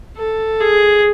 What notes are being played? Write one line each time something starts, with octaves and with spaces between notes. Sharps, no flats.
A4
G#4